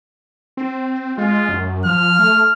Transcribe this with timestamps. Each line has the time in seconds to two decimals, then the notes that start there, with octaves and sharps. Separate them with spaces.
0.57 C4
1.18 G#3 F4
1.49 F#2
1.85 F3 F6
2.19 A3